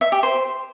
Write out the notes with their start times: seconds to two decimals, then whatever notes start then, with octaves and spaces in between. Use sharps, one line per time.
0.01 E5
0.12 G4
0.23 C5